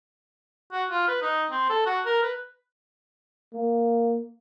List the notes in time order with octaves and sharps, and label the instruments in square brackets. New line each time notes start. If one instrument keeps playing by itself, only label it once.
[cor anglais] F#4
F4
B4
D#4
C4
A4
F#4
A#4
B4
[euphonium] A#3